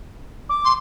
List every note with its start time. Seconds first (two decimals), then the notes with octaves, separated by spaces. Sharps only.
0.49 D6
0.65 C6